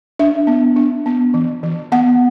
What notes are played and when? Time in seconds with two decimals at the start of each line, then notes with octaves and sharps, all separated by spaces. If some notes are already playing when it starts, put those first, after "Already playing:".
0.19 D4 E5
0.47 B3
0.76 D4
1.06 B3
1.34 E3
1.63 E3
1.92 B3 F#5